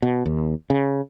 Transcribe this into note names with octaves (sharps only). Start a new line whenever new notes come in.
B2
D#2
C#3